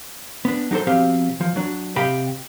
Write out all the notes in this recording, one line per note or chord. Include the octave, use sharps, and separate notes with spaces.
B3 D4
F#3 D#4 G4 A4 C5
B2 F3 C4 G4 F5
F3
F#3 D4
C3 G4 D#5 F5 G5 B5